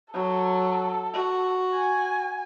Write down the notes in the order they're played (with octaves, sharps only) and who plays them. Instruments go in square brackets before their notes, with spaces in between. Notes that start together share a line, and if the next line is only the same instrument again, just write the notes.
[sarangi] F#3 [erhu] A4
[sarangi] F#4
[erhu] G#5